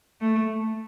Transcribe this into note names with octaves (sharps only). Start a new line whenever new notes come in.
A3